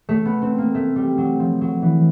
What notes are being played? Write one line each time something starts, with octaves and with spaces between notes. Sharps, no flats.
A3
B3
C4
A#3
A3
G3
F#3
F3
F#3
E3